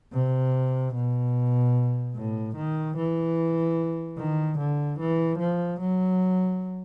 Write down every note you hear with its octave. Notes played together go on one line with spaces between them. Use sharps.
C3
B2
A2
D#3
E3
D#3
D3
E3
F3
F#3